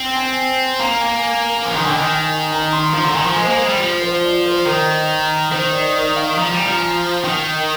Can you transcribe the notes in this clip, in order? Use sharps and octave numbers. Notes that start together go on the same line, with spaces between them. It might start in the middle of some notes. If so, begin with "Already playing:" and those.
Already playing: C4 G5
G#5
A#3 A#5
G#5
A#5
F3 G#5
D#3
D3 G5
D#3
G#5
A#5
C6
F3 C6
D3 A#5
D#3 G#5
F3
G#3 C5
A#3
G#3
G3
F3
C5
D5
C5
D#3 A#4
D#3 C5
D5
D5
F5
F3 A#5
G3
G#5
F3 A#5
D#3 G5